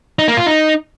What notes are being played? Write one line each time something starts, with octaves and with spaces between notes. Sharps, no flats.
D#4
A#3
F4
D#4